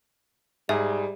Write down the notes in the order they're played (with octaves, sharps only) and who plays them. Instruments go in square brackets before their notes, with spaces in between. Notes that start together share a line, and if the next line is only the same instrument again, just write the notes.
[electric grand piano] G#2 G#4 A#5 [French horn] G3 [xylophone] E5